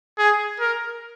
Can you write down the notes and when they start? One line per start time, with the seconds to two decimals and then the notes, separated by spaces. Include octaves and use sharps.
0.18 G#4
0.60 A#4